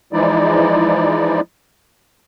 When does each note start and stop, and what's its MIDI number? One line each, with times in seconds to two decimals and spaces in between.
0.13 1.40 52
0.13 1.40 53
0.13 1.40 56
0.13 1.40 63
0.13 1.40 64
0.13 1.40 74